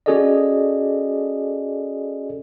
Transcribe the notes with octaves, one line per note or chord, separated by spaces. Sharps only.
C#4 F#4 G#4 A4 D5 D#5